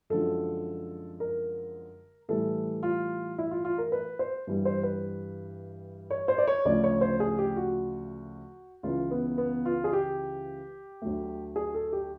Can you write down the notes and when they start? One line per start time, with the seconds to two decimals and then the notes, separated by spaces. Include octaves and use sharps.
0.10 F#2 D3 F3 G#3 A4
1.20 A#4
2.28 A2 E3 G3 A4
2.83 F4
3.38 E4
3.51 F4
3.65 F4
3.78 A#4
3.92 B4
4.19 C5
4.47 G2 E3 G3
4.65 C5
4.83 B4
6.10 C#5
6.28 C5
6.38 D5
6.47 C#5
6.65 D2 C#3 F3 A3 D5
6.84 C#5
7.01 C5
7.20 G#4
7.38 G4
7.56 F#4
8.83 C#2 C#3 E3 F4
9.11 B3
9.38 B3
9.65 F4
9.84 G#4
9.93 G4
11.02 D2 D3 F#3 A3
11.56 G#4
11.74 A4
11.93 G4